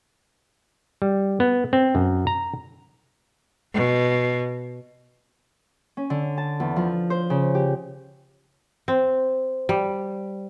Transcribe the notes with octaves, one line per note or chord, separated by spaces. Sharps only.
G3
B3
C4
F#2
A#5
B2
C#4
D3
A5
E2
F3
C5
C#3
G4
C4
G3